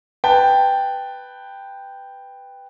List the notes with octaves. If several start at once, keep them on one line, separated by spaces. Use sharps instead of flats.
B4 G5 A5